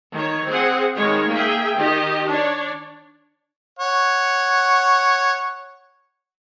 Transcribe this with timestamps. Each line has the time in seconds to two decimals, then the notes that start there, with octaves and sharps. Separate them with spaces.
0.11 D#3 C#5
0.46 C4 G#4 F#5
0.94 D#3 G#3 C#5
1.30 A#3 G#4 E5 G5
1.77 D#3 G4 D#5
2.30 D4 C#5 D5
3.79 C#5 F#5